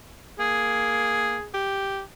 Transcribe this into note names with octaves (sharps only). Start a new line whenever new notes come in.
A#3 G#4
G4